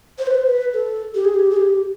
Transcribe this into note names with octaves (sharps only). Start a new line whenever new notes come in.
C5
B4
C5
B4
A4
G4
G#4
G4
G#4
G4